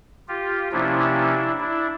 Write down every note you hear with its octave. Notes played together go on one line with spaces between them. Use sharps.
F4 G4
C3 F3 A#3 C#4 D4 E4
D4 E4